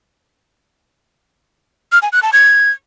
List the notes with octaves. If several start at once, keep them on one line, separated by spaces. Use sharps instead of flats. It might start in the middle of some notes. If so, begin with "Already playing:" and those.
F6
G#5
F#6
A5
G#6